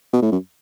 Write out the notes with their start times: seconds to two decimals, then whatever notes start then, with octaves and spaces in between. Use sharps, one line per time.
0.13 B2
0.22 A2
0.32 F#2